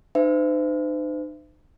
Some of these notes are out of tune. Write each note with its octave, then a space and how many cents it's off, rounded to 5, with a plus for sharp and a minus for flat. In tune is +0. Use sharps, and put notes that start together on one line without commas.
D#4 -40 C5 -40 E5 +25